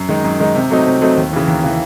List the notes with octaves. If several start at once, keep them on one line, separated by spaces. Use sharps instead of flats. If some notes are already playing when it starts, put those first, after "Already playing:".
Already playing: F#2
D#3 G#3 D#4
F#2
D#3 G#3 D#4
C3
F#3 A3 C4 D#4
C3
F#3 A3 C4 D#4
D#2
C#3 E3
D#2
C#3 E3